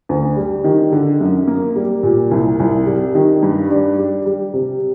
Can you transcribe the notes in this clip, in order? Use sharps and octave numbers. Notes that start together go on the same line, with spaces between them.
D2
G3
D#3
D3
F#2
A#3
G3
A#2
C2
C2
G3
D#3
G2
D4
G3
G3
C3